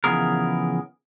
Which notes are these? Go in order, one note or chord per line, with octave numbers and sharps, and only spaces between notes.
C#3 E3 F3 B3 G#4 A#4